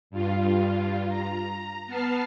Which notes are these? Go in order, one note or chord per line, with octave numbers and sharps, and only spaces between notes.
G2 F4
A#5
B3 A5 F6 C7